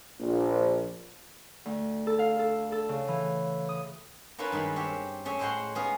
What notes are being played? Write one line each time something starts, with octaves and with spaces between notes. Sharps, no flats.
A#1
D2
A4
F5
A4
A4
C#3
E3
D#6
A#3 C#4 E4 F4 A4 B4
G2 D#3 G#3 B5
C4 G4 C#5 E5
A3 C#4 G#4 E5
A2 G#3 C5 C#5 F#5 C6
G#3 B3 C#4 G#4 F5